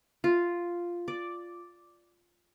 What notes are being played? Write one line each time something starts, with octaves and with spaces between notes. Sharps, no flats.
F4
D5